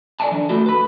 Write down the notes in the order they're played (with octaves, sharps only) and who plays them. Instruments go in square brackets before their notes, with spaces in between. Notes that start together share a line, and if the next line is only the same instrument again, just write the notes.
[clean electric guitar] A4 D5 E5 F5 G#5 A5
D3 E3
A3 E4 F#4 A4
B4 B5